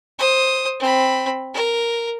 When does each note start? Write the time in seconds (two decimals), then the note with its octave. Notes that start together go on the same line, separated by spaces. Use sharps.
0.19 C5 D#6
0.80 C4 B5
1.54 A#4